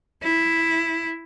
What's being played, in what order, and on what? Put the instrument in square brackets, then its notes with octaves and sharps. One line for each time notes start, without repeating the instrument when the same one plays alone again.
[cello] E4